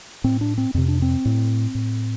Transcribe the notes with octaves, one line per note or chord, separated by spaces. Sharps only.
A2 C4
D4
C4
F2 C3 C4
D4
C4
A2
A2